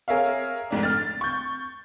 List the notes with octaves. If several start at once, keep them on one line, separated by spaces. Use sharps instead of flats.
G#4 A#4 C#5 E5 F5
F1 G#2 D4
F6 A6
C#6 G6